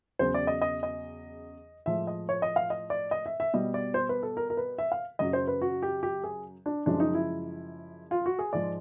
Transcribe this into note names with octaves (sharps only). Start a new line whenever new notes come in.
E2 C#3 F#3 C5
D5
D#5
D#5
D#5
A2 F3 G#3 E5
D#5
C#5
D#5
F5
D#5
D5
D#5
E5
E5
B2 G3 D#5
D5
C5
B4
A4
A#4
A#4
B4
E5
F5
F#2 C#3 F#3 D#5
C5
B4
F#4
G4
G4
G#4
D4
F#2 C#3 F3 G#3 D4
D#4
E4
F4
F#4
G#4
G#2 F3 G#3 D5